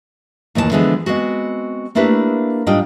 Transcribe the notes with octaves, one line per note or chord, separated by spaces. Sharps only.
D#2 A#2 E3 F4 A5
D3 E3 F3 G#3 B3 C4
G#3 B3 C4 F#4
A3 A#3 D4 E4 G4 B4
G#2 G3 D4 F4 D#5 G5